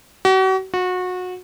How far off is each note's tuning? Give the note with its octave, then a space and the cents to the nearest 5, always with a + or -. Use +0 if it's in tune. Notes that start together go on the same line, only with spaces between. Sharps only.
F#4 +40
F#4 -25